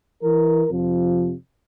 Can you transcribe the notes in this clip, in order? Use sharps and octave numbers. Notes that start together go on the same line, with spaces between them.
E3 A#4
F2 C3 F3